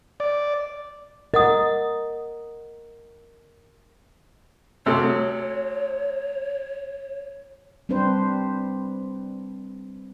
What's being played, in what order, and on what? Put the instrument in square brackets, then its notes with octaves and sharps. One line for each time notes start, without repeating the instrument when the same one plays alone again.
[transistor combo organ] D5
[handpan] A#4 [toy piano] D#5 F#5 D#6
[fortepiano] D2 C3 A4 [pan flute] C#5
[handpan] G3 C4 D4 B4 C5